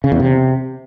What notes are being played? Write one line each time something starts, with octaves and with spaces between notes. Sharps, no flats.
C#3
E2
C3